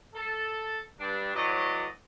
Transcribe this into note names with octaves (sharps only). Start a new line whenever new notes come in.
A4
G2 D4
A2 E3 F#3 D5 D#5